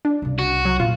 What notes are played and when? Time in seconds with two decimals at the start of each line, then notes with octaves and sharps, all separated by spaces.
0.05 D4
0.22 C2 C#3
0.39 F#4
0.65 F#3
0.80 F2 A#2 F4